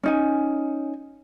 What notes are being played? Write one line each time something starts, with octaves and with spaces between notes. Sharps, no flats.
C#4 D#4 G#5